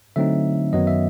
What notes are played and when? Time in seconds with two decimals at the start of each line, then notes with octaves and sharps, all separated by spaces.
0.16 D3 F#3 A3 C4 D#4 E5
0.73 F#2 D#3 F#3 B3 D#5
0.87 E5